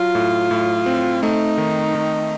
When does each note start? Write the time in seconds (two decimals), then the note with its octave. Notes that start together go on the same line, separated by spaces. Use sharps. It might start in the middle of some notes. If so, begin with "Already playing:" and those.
Already playing: F#3 F4
0.15 A2
0.51 A2
0.86 C4
1.22 A3 D#4
1.58 D#3
1.95 D#3